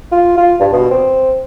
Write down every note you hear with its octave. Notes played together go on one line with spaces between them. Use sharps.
F4
F4
G2
B2
C4